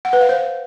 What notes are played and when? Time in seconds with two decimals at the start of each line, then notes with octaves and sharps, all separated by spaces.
0.05 F#5
0.13 B4
0.21 F5
0.29 C5